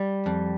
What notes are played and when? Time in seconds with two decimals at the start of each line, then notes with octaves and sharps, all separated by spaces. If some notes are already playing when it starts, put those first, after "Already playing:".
Already playing: G3
0.26 F2